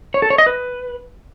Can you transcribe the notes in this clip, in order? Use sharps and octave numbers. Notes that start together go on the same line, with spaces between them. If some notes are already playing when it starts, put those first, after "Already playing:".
C#5
A4
C#5
D#5
B4